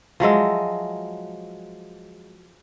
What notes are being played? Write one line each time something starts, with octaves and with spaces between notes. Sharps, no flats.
F3 F#3 G#3 E5